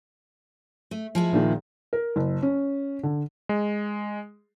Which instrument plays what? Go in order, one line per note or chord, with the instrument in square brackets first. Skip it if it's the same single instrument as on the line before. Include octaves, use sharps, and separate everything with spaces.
[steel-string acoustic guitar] A3
F3 G#3 E4
[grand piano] A#1 A#2 D#3
[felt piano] A#4
F#1
C#4
D3
[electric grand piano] G#3